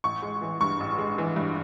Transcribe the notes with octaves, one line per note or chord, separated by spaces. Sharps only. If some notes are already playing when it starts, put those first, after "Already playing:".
A1 C#6
G#3
E3
G2 C#6
A1
G#3
E3
G2